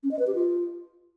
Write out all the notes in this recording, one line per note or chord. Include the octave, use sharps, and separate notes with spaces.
C#4
D#5
B4
G4
F4